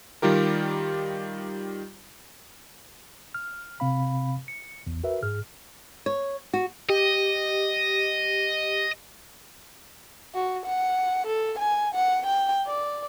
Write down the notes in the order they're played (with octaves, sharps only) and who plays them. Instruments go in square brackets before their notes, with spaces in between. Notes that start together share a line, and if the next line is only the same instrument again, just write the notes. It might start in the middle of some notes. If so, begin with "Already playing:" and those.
[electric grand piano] D#3 G3 F4 G4 A#4
[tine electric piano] F6
G1 C3 C4 F5 B5
C#7
A1 E2
F#4 A#4 B4 E5
G#2 G#4 F6
[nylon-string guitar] C#5
F#4
[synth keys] G4 [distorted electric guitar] D#5
[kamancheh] F#4
F#5
A4
G#5
F#5
G5
D5